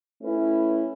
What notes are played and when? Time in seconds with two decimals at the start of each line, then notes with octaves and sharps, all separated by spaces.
0.22 A3 C#4 E4 B4